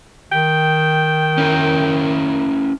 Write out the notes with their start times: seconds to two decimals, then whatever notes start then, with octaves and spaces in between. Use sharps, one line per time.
0.32 D#3 G5
1.38 C#4 E4 A#4